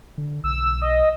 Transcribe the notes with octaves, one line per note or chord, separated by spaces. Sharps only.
D3
B1 E6
D#5